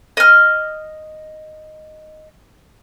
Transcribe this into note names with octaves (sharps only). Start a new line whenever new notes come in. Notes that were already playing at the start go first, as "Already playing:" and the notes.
D#5 F6